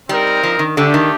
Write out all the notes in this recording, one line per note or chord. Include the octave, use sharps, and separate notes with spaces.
G3 C4 D#4 A#4
F3
D#3
D3 A3 D4 G4
D#3